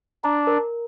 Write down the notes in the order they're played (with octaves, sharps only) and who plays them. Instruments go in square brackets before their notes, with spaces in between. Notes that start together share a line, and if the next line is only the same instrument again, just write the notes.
[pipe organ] D4 [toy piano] A#5
[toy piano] A#4